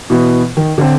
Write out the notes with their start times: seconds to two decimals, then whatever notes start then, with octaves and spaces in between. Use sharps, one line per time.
0.10 B2 E3 B3
0.57 D#3
0.78 D3 C4